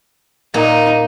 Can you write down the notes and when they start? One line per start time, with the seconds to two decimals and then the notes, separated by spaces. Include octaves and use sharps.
0.54 A#2 A#3 D#4